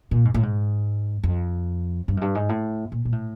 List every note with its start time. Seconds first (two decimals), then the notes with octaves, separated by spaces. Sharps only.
0.11 A#2
0.25 G#2
0.34 A2
0.43 G#2
1.23 F2
2.08 G2
2.17 F#2
2.21 G2
2.35 G#2
2.49 A2
2.92 A#2
3.05 A#2
3.12 A2